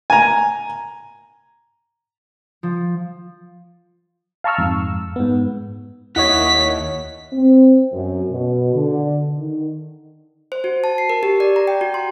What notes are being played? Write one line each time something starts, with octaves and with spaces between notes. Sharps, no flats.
G#5 A#5
F3
F5 A5 A#5 C#6 E6 F6
F2 G#2 E6
G#2 B3
D#2 E4 C#5 D#5 F#5 B6
C4
F#2
B2
D3
D#3
C5
F#4
A5
C7
A#4
G4
D5
A#5
G5
F#4
C6